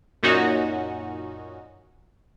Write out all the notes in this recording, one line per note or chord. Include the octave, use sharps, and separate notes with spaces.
F#2 A#2 C#4 D#4 F#4